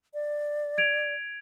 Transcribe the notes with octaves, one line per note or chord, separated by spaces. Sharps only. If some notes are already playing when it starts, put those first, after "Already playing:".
D5
G#6 D7 F7